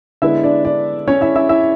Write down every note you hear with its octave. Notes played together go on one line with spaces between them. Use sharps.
D3 G#3 B3 E4 E5
D4 D5
D4 D5
C#4 C#5
E4 E5
E4 E5
E4 E5